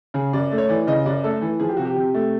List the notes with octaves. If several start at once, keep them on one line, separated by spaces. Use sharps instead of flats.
C#3 G#4
F#2 D5
A3
C#5
E3 D5
C#3 D#5
F#2 D5
A3 A4
E3
F3 G#4
G4
C3 F#4
G4
C3
A3